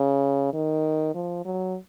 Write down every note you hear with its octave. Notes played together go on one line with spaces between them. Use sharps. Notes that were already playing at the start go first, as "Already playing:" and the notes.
Already playing: C#3
D#3
F3
F#3